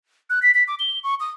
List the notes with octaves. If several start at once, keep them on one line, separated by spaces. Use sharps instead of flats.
F#6
B6
B6
D6
G7
C#6
D#6